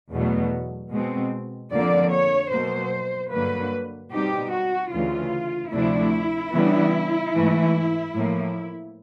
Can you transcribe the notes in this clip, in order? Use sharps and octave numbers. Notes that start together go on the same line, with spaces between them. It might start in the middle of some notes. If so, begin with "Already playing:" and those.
E2 B2 F#3 A3
B2 G#3 C4
F2 D3 F3 A#3 D5
C#5
B2 F#3 A#3 C5
G2 D3 F#3 A#3 B4
B2 G3 C4 D#4 G4
F#4
D2 C#3 E3 F4
D2 C3 F3 A3 D4 E4
C#3 E3 G3 B3 D4
G#2 E3 A3
A2 F3 A#3